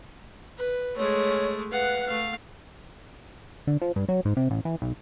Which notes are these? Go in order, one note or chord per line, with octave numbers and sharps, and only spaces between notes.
B4
G#3 A3 C#5
B4 F5 F#5
A3 F5
D3
F3
G2
F#3
G#2
C3
A1
E3
B1